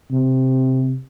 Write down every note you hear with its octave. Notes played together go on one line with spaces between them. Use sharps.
C3